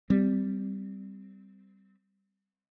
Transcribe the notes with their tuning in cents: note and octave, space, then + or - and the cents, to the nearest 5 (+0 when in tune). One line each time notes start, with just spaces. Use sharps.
G3 +0 C4 -15